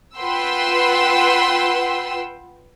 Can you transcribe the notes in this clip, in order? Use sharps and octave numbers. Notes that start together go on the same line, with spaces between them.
F4 B4 F#5 G5 C6 E6